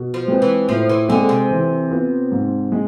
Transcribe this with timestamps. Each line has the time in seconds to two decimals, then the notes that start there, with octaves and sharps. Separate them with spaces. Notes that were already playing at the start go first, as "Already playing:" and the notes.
Already playing: B2
0.14 F3
0.28 G#3 C4 G#4 B4
0.42 E3
0.69 A2 F3
0.89 E3
1.09 D3 G#3 C4 G#4
1.29 C3
1.51 E3
1.91 B3 F4
2.32 G#2
2.72 G#3